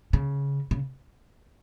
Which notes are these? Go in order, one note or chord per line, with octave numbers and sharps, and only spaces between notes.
C#3
C#3